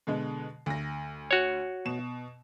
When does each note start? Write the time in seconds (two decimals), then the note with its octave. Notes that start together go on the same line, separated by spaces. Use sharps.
0.07 B2 D3 G#3
0.66 D2 A#6
1.31 F#4 C#5
1.85 B2 E7